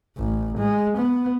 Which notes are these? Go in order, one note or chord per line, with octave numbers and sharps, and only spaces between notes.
A1
G#3
B3